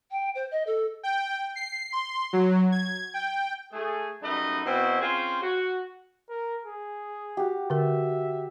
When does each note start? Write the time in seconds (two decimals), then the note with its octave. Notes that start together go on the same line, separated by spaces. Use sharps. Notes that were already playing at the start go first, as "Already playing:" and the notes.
0.11 G5
0.35 C5
0.51 D#5
0.67 A4
1.03 G5
1.56 C7
1.92 C6
2.33 F#3
2.72 G#6
3.14 G5
3.73 A3 G#4
4.22 F#2 G3 A3 D#4 B4 D#5
4.65 B2 C4 E4
5.01 C4 C#4 F4 G#4 C5
5.43 F#4
6.29 A#4
6.65 G#4
7.37 F#4 G4
7.70 D3 A#4 E5